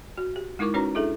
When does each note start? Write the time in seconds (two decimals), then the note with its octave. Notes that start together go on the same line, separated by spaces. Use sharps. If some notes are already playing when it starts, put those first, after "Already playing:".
0.17 F#4
0.36 G4
0.59 G#3 D#4 E4 A#4 C#6 D6
0.74 C#4 D#4 F#4 B4 C#5 A#5
0.95 D4 E4 G#4 A4 E5